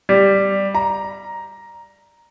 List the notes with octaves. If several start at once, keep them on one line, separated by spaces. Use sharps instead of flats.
G3
A#5